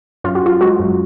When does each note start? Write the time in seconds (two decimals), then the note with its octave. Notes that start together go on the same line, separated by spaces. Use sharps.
0.24 F#2 F4
0.35 F#4
0.43 F#2 F4
0.61 G#3 F#4
0.79 F#2